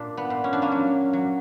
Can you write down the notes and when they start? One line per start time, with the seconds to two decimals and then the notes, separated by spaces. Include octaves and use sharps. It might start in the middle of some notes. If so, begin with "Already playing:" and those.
Already playing: A#2 D4
0.17 B3
0.30 A#2
0.44 C#4
0.53 D4
0.62 A#3 C#4
0.72 F#3
1.13 F#3